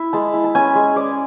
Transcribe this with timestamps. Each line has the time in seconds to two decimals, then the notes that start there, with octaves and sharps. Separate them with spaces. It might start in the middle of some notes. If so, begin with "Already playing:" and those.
Already playing: E4
0.13 G#3 A5
0.34 E4
0.44 A5
0.55 C#4 G#5
0.75 G#3
0.96 C#4 D5